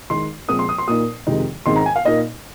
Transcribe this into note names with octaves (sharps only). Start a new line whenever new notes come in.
D#3 G#3 D#4 C6
A#2 F3 G#3 C4 D#6
C6
D#6
C6
A#2 A#3 D#4 D#6
F2 C3 D#3 G#3 D#4
G#2 D#3 G#3 C4 C6
A#5
G#5
F5
A#2 A#3 D#4 D#5